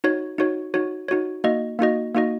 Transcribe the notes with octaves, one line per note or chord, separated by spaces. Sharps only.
D#4 F#4 C#5
D#4 F#4 C#5
D#4 F#4 C#5
D#4 F#4 C#5
A#3 D#4 F#4 D#5
A#3 D#4 F#4 D#5
A#3 D#4 F#4 D#5